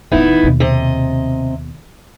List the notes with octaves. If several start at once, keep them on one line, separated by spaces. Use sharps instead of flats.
D1 D#3 B3 D#4 E4
D#2 B2
C3 D#5